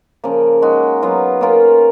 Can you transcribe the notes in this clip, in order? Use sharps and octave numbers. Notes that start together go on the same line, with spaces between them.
C#3 F3 A#3
G#3 D#4 F#4
F#3 B3 F4
A#3 C#4 F4 A#4